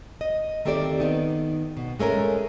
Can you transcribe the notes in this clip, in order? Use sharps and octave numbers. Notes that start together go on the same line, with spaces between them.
D#5
D#3 A3 C4 G4 A4 D5
D#3 B3 D#4
B2
G#3 A3 C#4 A#4